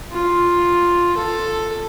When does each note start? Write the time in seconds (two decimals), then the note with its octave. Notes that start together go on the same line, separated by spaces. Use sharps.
0.12 F4
1.17 A4